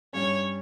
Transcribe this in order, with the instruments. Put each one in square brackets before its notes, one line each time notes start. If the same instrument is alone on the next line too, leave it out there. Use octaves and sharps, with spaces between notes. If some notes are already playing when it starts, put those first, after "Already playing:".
[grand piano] G2 G3 C#4 [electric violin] C#5